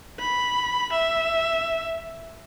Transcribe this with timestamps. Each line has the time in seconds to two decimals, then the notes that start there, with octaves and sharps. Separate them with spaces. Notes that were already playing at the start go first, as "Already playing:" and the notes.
0.19 B5
0.92 E5